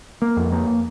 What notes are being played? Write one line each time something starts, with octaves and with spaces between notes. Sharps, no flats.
A#3
F2
A#3